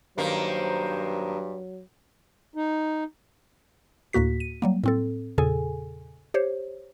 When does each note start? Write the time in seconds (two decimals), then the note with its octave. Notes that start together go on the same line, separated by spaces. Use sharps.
0.18 G2 D#3 F#3 A#3 C5
2.55 D#4
4.13 D2 A2 A#3 F#4 B6
4.40 D#7
4.62 F#3 G3 A#3
4.84 A2 C4 A4
5.38 E2 A#2 C#3 G#4 A4 G#5
6.34 G4 C5 C#5